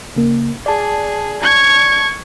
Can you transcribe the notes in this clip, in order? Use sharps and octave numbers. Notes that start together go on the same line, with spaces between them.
C#3 A#3
G#4 D5 A5
C#6 G#6